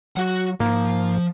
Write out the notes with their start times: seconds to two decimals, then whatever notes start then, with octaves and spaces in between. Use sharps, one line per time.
0.17 F#3 F#4 F#5
0.60 G#2 F3 A#3